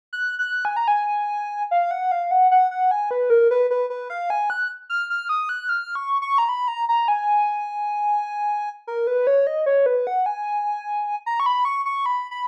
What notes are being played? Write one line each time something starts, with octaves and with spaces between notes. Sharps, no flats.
F#6
F#6
G#5
A#5
G#5
F5
F#5
F5
F#5
F#5
F#5
G#5
B4
A#4
B4
B4
B4
F5
G#5
F#6
F6
F6
D#6
F#6
F6
C#6
C#6
A#5
B5
A#5
A#5
G#5
A#4
B4
C#5
D#5
C#5
B4
F#5
G#5
A#5
C#6
B5
C#6
C#6
B5
B5